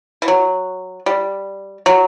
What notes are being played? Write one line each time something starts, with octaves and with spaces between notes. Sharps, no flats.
E3
F#3
G3
F#3